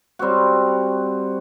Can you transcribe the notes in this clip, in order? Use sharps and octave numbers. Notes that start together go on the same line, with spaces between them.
G3 C4 F#4